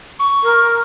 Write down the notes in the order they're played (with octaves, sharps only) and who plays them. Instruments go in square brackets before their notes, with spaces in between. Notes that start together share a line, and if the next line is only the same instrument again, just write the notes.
[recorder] C#6
[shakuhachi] A#4